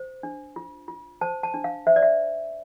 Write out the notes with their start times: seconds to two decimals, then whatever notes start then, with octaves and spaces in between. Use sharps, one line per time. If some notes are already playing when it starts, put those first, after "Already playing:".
Already playing: C5
0.23 D4
0.56 F4
0.88 F4
1.21 C5 A5
1.43 A5
1.54 D4
1.64 F5
1.87 C5 E5
1.96 D5
2.02 E5